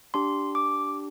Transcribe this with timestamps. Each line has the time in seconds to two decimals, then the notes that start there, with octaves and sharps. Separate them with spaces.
0.14 D4 G4 C6
0.55 D6